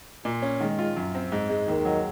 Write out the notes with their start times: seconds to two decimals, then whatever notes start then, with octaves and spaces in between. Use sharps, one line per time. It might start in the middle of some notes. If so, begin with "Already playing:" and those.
0.25 A#2 F4
0.42 C#4
0.61 D#3 G#3
0.79 F4
0.97 F#2
1.15 C4
1.32 G#2
1.49 G#3
1.67 D#2 D#3
1.85 F#3